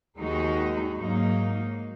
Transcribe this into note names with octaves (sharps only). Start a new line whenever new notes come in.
D#2 D#3 G#3 D#4 F#4
G#2 F#3 A#3 D#4